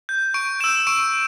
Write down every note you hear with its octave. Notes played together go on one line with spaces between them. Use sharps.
G6
C#6 D7
E6 G6 E7
C#6 D7